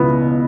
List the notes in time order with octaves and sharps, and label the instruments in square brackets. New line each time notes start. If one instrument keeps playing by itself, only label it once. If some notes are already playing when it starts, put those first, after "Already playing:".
Already playing: [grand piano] C#2 B2 B3 E4